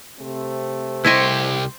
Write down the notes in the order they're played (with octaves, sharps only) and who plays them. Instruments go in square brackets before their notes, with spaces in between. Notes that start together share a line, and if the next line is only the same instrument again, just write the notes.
[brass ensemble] C3 A3 C4
[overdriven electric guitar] C2 G4 [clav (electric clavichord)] E4 D#5 [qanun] C5 C6 C#6